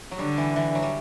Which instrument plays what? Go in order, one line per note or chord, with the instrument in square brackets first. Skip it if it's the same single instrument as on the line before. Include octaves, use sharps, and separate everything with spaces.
[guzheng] F#3
[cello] D3 [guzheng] G3
[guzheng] E3
E3
F#3
G3